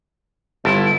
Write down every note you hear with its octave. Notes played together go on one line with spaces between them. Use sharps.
G1 E4 A4